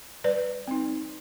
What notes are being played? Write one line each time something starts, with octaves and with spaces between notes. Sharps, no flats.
G3 B4 D5
C4 D#4